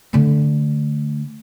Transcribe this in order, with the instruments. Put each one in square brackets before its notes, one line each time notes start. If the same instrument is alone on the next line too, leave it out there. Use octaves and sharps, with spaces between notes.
[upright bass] D3 A3